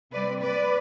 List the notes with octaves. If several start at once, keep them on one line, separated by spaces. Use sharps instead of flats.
C3 G3 C4 B4 D5
B4 D5